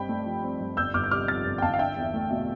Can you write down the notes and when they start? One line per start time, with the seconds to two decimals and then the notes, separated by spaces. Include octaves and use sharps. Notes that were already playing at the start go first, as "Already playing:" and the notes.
Already playing: G2 C4 G5 B5
0.09 A3
0.26 F3
0.43 C4
0.60 G2
0.77 G1 E6 G6
0.94 G1 D6 F6
1.04 G6
1.11 C3 D6 F6
1.28 F2 F6 A6
1.45 G1
1.58 G5
1.62 G1 F5 A5
1.74 F5
1.79 D4 E5 G5
1.97 E2
2.14 A3
2.31 B2